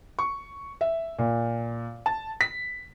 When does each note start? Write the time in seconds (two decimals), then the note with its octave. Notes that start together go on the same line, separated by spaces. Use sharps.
0.19 C#6
0.81 E5
1.19 A#2
2.06 A5
2.41 B6